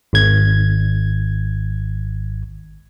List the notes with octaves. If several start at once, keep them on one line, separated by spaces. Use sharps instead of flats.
G#1 G#6